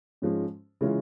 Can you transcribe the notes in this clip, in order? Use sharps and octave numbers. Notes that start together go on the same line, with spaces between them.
G#2 F3 G#3 C#4
C#3 E3 G#3 C#4 F4